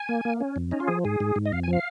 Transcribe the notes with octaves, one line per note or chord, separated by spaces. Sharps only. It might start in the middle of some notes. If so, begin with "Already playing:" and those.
Already playing: G#5
A#3
A#3
C#4
F2
C#4 D#4
F4
F3 G#4
G#2 G#4
G#2
G#2
D#5
F2 F5
G#5
F3
F5